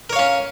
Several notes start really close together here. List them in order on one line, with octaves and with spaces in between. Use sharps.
A#4 C#5 F5 C#4